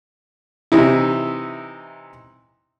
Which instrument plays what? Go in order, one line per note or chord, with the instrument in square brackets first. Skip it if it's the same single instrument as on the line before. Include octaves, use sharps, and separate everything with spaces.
[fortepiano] C3 E3 D#4 E4